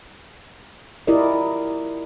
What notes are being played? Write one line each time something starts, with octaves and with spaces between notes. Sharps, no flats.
E4 F4 G4 A#4 D5 D#5